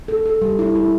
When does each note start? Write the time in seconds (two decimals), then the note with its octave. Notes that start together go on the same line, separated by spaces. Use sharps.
0.08 A4
0.26 A4
0.42 G3
0.59 E4
0.75 E4